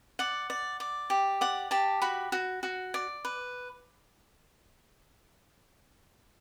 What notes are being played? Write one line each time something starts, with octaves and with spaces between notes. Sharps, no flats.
D5 F#5
D5
D5
G4
D5 F#5
G4 A5
F#4 B5
F#4
F#4
D5
B4